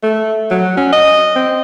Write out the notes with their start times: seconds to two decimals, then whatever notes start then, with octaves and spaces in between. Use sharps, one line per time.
0.03 A3
0.51 F#3
0.77 C#4
0.93 D#5
1.36 C4